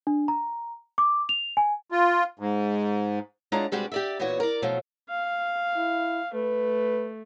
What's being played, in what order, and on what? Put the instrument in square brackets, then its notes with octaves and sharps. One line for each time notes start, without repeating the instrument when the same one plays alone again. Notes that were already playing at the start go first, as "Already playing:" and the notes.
[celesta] D4
A#5
D6
F7
G#5
[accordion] F4
G#2
[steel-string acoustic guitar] G#3 D4 F4 C#5 F#5 A#5
C3 G3 G#3 F#4 G4 B4
G4 D5 E5
A#2 E3 B3 F#4 C#5
A#4 D5
B2 F3 F#3 A3 F4
[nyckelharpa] F5
[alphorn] E4
[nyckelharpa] A3 [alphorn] B4